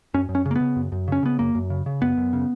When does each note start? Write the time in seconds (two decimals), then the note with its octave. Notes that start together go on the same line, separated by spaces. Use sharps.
0.14 F#2 C#4
0.29 F#2
0.35 C#4
0.46 C#3
0.51 A#3
0.56 B3
0.61 C#3
0.76 F#2
0.92 F#2
1.08 C#3 C#4
1.23 C#3 B3
1.39 F#2 A#3
1.55 F#2
1.70 C#3
1.86 C#3
2.02 F#2 B3
2.17 F#2
2.33 C#3